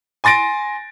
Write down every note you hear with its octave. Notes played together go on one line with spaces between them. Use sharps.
G#5 C6 A6 A#6 D7